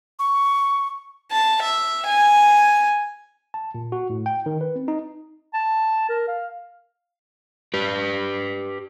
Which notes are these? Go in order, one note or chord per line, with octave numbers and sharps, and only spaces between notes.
C#6
A5
E5
G#5
A5
A#2
F#4
A2
G5
D#3
B4
C4
D#4
A5
A#4
F5
G4 B4